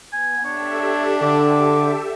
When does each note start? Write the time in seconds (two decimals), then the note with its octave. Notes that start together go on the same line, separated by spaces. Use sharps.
0.13 B3 G#5
0.45 D4 G4 A4 C#5 E5
1.22 D3 D6